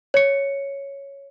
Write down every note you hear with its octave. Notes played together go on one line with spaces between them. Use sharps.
C#5 C#7